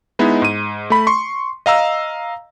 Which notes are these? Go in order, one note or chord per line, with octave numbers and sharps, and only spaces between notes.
G#3 B3 D#4 E4
G#2 D#7
A3 B5
C6 C#6
D#5 F5 A#5 E6